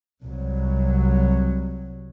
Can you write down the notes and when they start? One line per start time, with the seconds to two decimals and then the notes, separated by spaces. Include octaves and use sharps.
0.23 C2 F#3